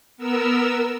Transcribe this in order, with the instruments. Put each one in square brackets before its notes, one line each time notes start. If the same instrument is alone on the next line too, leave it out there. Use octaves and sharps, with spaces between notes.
[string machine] B3 A#4 E6